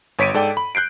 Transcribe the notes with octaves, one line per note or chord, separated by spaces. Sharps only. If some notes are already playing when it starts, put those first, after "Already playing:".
G1 C#5 B6 D7 D#7
G#2 A4 D5 G5
B5
F#6 G6 C7 D7